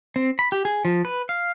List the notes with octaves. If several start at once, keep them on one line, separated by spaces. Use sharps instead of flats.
C4
B5
G4
G#4
F3
B4
F5